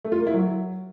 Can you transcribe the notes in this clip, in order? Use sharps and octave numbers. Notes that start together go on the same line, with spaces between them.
A3
F4
A#3
E4
F#3